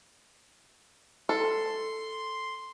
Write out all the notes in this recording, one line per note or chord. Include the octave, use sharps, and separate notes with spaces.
A4 C6